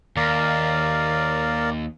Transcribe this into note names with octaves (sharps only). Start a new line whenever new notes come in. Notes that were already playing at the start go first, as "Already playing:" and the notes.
D#2 A#4 D5 F5